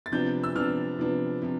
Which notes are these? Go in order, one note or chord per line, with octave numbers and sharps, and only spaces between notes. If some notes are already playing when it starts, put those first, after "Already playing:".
A6
C3 F3 B3 D4 G6
E6
C3 F3 B3 D4 F6
C3 F3 B3 D4
C3 F3